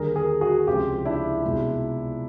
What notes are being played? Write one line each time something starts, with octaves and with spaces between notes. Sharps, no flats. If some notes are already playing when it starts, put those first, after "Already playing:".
Already playing: D#2 D3 G3 G#4 A#4
G#4 A#4
F#4 G#4
C#2 C3 F3 G#3 F4 G4
D4 E4
C2 B2 G#3